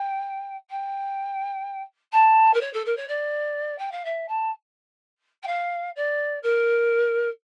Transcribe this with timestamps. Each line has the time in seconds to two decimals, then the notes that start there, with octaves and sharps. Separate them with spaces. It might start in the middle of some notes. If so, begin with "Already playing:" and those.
Already playing: G5
0.70 G5
2.12 A5
2.53 A#4
2.60 C#5
2.73 A4
2.85 A#4
2.96 C#5
3.08 D5
3.78 G5
3.91 F5
4.04 E5
4.28 A5
5.42 G5
5.47 F5
5.96 D5
6.42 A#4